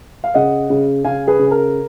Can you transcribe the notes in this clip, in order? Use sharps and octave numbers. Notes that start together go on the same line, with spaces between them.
F5
C#3 D#5 F#5
C#3
C#3 F5 G#5
G#4 B4
C#3
A#4